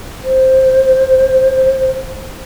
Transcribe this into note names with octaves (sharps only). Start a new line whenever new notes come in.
C5